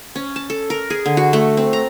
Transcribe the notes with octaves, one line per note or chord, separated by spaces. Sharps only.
C#4
A5
A4
A#4
G#4
D3
F#4
A3
C4
A#5